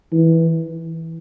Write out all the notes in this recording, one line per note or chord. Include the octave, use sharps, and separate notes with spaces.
E3